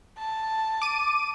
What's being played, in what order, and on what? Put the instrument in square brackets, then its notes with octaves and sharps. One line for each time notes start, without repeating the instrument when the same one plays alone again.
[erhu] A5
[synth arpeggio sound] D6 D#7